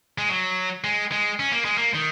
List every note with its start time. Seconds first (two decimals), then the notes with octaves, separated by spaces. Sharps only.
0.18 G#3
0.29 F#3
0.84 G#3
1.12 G#3
1.40 C#4
1.52 A#3
1.65 G#3
1.78 A#3
1.94 D#3